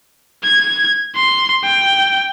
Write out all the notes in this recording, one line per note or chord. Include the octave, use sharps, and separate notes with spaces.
G#6
C6
G5